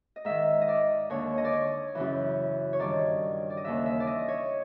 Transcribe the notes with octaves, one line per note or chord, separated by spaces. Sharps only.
D#5
G#2 D#3 E5
D#5
D5
D#2 D3 C#5
D#5
D5
C#5
F#2 C#3 E3
C#5
G2 D#3 D5
D5
D#5
D#2 C#3 E3 E5
E5
D5
D#5
C#5